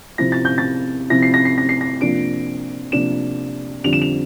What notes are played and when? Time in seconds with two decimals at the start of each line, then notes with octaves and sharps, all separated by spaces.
0.18 C3 F3 C4 E4 A#6
0.32 A6
0.45 G6
0.58 A6
1.10 C3 F3 C4 E4 A#6
1.22 C7
1.34 A#6
1.45 C7
1.58 A#6
1.69 C7
1.81 A#6
2.01 C3 F3 A#3 D4 D7
2.92 C3 F3 A#3 D4 E7
3.84 F2 D3 G3 D4 F7
3.93 E7
4.02 F7